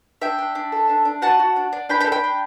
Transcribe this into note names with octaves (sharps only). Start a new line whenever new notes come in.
D4 E5 G5
D4
D4
A4
D4
D4
F#4 F#5 A5
F#4
D4
D4
D4 G5 B5
G5 B5
A4
G5 B5
D4